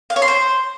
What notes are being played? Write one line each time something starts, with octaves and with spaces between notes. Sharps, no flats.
F5
C#5
C6
C5